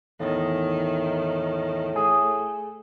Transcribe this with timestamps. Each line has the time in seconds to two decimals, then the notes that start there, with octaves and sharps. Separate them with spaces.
0.20 E2 A2 D#3
1.96 A3 G#4